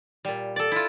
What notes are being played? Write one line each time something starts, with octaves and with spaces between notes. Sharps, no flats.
A#2 G3
A4 D5
E4 F4